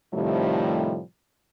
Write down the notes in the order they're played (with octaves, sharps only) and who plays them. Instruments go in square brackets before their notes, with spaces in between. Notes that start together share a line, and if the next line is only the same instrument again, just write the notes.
[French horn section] A2 C3 D#3 F3 G3 A3